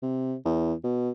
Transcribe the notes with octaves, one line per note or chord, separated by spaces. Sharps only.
C3
E2
B2